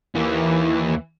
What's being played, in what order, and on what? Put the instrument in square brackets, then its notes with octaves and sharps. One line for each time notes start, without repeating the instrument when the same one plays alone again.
[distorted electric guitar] D#2 A#3 [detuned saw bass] E3